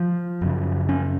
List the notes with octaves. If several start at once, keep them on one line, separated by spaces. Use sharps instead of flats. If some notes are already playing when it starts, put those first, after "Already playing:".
Already playing: F3
F#2 C#3
C#4